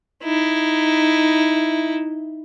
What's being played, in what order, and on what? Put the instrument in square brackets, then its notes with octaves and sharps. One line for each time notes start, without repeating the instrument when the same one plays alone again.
[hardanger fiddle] D#4 E4